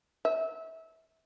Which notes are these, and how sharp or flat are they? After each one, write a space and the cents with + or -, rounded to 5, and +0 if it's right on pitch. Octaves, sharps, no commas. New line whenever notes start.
E5 -25